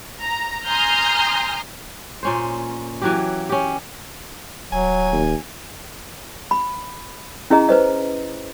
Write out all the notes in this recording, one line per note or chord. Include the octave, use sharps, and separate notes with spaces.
A#5
G#5 A#5 C6 D#6 F6 G6
A#2 C#4 C5
E3 F#3 G4
C#4 G4
D1 F#3 G#5
D#2
B5
C#4 E4 G#4 D#5 A#5
B4 C5 D#5